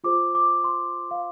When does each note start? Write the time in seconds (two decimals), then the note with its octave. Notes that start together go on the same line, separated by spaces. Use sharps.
0.04 F4 G#4 C5 D6
0.35 D6
0.64 C6
1.11 F5